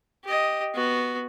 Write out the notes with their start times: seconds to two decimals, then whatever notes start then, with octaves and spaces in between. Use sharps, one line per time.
0.24 G4 D#5
0.74 B3 F#4